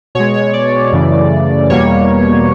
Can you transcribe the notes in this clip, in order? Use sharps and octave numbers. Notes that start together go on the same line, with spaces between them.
B2 G#3 C#5
C#5
D5
F#2 C#3 E3 A3
E2 B2 G3 A#3 C#5